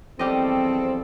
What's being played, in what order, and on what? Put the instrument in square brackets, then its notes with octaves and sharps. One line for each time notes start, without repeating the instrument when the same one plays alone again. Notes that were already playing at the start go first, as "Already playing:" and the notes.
[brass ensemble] E2 F3 A4 [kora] G3 G4 D#5 [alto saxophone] C4